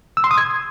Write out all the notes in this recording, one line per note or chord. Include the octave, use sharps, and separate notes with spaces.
E6
C6
D#6
G#6